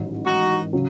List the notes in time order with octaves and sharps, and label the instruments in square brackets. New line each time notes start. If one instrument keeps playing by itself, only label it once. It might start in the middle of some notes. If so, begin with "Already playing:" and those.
Already playing: [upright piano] A1 G#2 D#3 F#3
[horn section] D#4 F#4
[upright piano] C#3 F#3